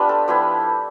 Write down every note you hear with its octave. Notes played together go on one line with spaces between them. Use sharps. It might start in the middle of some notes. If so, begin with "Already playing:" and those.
Already playing: A3 B3 D4 F4 G4 B4
A4
F3 B3 E4 G4